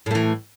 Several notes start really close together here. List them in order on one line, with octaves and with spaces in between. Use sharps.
A2 A3 E3